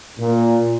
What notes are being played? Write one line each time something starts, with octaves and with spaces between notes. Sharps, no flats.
A#2